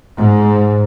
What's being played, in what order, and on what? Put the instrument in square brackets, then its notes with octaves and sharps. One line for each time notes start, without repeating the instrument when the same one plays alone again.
[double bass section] G#2